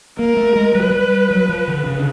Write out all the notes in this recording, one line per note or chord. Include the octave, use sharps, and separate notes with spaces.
A#3 A#4
A3
G#3
G3 B4
F#3
G3
F#3
F3
D3
C#3
D3